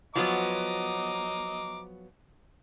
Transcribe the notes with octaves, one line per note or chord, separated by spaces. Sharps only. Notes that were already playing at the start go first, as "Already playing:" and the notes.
F3 F#3 B3 D#5 A#5 D6